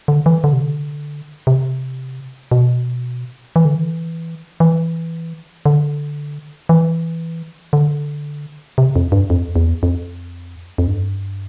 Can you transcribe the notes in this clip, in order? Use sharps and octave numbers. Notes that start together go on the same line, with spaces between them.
D3
E3
D3
C3
D3
C3
B2
E3
D3
E3
E3
D3
E3
D3
C3
F2
G2
F2
E2
F2
F2
G2